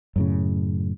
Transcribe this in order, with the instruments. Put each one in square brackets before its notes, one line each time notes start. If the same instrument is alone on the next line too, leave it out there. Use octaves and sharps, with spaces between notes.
[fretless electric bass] F#2 A2 C#3